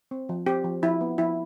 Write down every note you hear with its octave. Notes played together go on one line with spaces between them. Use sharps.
C4
F3
C4 G4
F3
F3 E4
B3
F3 E4